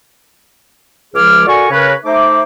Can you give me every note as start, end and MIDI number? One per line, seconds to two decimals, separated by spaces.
1.15 1.46 37
1.15 1.46 53
1.15 1.46 56
1.15 1.46 68
1.15 1.46 86
1.15 1.46 89
1.47 1.67 66
1.47 1.67 69
1.47 1.67 70
1.47 1.67 74
1.47 1.67 80
1.47 1.67 85
1.71 1.93 49
1.71 1.93 70
1.71 1.93 71
1.71 1.93 73
2.05 2.42 57
2.05 2.42 63
2.05 2.42 72
2.05 2.42 76
2.05 2.42 86